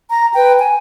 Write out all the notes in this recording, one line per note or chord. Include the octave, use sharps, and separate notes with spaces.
A#5
B4 G5
G#5